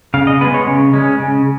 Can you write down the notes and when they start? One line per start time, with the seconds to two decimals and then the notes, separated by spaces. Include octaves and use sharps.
0.14 C#3 F5
0.27 D#5
0.41 B3 B4
0.45 G#3
0.54 C#5
0.68 C#3
0.93 G#3 C#4
1.20 C#3